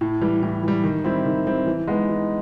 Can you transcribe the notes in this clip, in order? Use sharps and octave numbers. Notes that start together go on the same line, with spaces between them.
A2
E3 G3
A2
E3 G3
D#3
G3 C4 E4
D#3
G3 C4 E4
E3
G#3 B3 D#4
E3